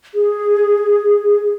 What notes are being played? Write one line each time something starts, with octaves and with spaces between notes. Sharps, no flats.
G#4